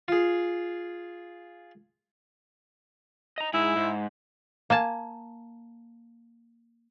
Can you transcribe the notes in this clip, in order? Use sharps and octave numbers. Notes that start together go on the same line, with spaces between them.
F4 G#4
D#5 A#5
G#2 E4 G#4
G#2
A#3 G#5 A5